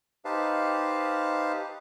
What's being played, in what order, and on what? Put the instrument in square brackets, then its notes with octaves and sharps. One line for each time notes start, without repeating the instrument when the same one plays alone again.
[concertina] D#4 G4 B4 C5 F5 A5